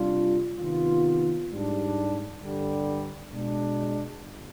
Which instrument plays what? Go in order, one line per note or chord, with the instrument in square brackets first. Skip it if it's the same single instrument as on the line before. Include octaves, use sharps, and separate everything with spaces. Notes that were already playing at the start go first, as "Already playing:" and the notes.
Already playing: [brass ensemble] C3 G3 D4 F4
C3 D#3 B3 F4
G#2 G3 D4
G2 D3 G3
B2 G#3 D4
G1